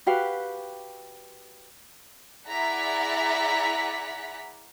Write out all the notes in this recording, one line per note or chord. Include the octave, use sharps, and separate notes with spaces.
F#4 G4 B4 F5
E4 G#4 D5 F#5 A#5 B6